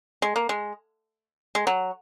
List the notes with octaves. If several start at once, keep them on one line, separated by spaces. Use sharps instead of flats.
G#3
A#3
G#3
G#3
F#3